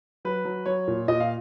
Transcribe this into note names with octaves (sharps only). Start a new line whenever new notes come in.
F#3 B4
F#3
F#3 C#5
A#2
A#2 D#5
F5